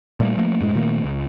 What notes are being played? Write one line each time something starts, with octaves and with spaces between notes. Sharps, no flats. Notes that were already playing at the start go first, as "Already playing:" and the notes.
A#2 G3 A3 A#3
F3 A3 A#3
F#2 A2 G#3
A#2 D#3 A3 A#3
C#2